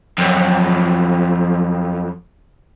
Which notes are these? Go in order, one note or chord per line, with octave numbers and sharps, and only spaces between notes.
F2 F#3